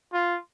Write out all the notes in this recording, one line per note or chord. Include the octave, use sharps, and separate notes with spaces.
F4